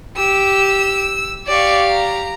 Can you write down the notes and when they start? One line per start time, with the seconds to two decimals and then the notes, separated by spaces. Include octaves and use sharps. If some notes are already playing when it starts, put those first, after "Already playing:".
0.17 G4 E6
1.47 G4 D5 F5 C#6
1.91 A#5